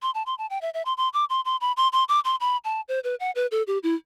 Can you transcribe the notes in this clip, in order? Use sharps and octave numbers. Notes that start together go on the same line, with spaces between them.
C6
A5
C6
A5
G5
E5
E5
C6
C6
D6
C6
C6
B5
C6
C6
D6
C6
B5
A5
C5
B4
F#5
B4
A4
G4
E4